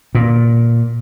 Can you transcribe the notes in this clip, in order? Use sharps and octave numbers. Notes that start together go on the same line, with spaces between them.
A#2